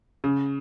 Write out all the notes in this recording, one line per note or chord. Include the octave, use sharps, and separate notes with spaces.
C#3